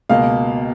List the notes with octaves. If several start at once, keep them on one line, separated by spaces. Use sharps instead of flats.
C#2 B2 A#3 F5